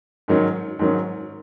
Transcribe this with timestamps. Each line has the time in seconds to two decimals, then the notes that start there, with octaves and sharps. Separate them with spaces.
0.28 G#2 D#3 F#3 C#4
0.79 G#2 D#3 F#3 C#4